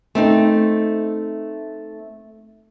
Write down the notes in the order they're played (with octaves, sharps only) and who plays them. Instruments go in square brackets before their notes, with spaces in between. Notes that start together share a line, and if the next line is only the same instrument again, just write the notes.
[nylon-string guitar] A3 C4 D#4